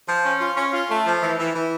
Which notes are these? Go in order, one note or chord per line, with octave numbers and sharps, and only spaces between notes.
F3
C#4
F4
C#4
F4
A3
F3
E3
E3
E3